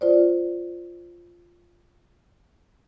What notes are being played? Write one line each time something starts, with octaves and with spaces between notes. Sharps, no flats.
F4 C5 D5